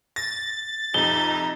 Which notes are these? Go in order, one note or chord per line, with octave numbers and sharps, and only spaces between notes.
A6 A#6
F2 C3 D#4 G7